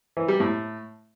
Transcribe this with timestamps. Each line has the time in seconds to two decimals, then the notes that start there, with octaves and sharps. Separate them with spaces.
0.17 E3
0.28 G3
0.40 A2